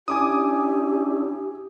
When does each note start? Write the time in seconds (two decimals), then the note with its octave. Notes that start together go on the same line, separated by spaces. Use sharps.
0.08 C#4 D4 E4 G4 G#5 D6 D#6